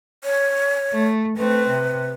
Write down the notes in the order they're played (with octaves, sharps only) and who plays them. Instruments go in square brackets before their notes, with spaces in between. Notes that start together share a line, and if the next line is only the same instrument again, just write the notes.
[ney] C#5
[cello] A3
[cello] A3 C4 [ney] B4
[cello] C3